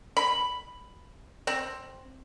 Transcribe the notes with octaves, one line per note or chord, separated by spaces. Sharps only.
B5
C4